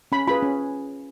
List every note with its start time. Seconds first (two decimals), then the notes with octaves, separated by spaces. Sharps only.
0.12 C#4 B5
0.27 F4 G#4 B4 B5
0.42 C#4